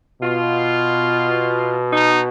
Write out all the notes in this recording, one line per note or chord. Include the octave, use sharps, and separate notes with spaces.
B2 F4
D#4